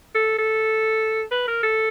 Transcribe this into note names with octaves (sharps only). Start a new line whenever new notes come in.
A4
A4
B4
A#4
A4